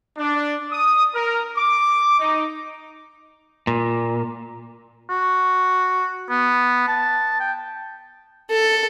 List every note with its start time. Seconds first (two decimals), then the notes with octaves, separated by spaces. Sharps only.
0.18 D4
0.72 D#6
1.15 A#4
1.57 D6
2.20 D#4
3.67 A#2
5.10 F#4
6.30 B3
6.88 A5
7.40 G5
8.50 A4